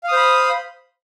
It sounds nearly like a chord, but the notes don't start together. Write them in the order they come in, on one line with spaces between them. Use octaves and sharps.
F5 D#6 C5 B5